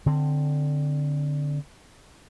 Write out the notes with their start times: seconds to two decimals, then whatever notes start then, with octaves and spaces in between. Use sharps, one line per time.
0.06 D3 C4